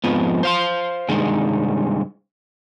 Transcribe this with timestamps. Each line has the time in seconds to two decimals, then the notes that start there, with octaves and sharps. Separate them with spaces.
0.04 F2 G#2 F3 B3
0.43 C5 F5 C6
1.08 C2 G2 D#3 G#3